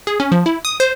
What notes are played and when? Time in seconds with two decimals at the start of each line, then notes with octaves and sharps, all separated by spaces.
0.07 G#4
0.20 C#4
0.32 F3
0.46 E4
0.65 D#6
0.80 C5